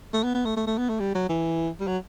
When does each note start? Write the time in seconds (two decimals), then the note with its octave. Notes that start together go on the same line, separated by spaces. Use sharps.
0.13 A3
0.24 B3
0.34 B3
0.45 A3
0.57 A3
0.67 A3
0.78 B3
0.89 A3
1.00 G3
1.15 F#3
1.29 E3
1.81 G3
1.87 F#3